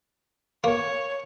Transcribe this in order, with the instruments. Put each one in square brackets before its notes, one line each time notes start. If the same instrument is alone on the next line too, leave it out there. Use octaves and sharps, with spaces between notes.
[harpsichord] A#3 [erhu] C#5